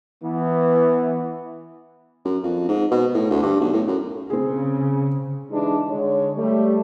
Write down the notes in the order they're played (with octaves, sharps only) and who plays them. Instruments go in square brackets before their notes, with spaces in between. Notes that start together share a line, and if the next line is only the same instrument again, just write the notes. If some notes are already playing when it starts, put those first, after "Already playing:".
[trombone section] E3 B3
[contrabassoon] F#2
F2
G#2
B2
A2
D2
G2
B1
A2
F#2
[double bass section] C#3 [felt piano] C4 G#4
[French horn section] E3 G3 G#3 D4 D#4
D3 G#3 C#5
G3 A3